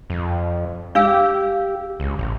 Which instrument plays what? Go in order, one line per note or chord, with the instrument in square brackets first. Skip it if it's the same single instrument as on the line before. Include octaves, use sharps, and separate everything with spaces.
[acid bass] F2
[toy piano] D4 F5 E6 [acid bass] G4
[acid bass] C#2
A1